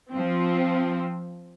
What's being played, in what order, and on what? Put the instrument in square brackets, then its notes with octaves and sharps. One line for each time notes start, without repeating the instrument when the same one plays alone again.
[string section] F3 C4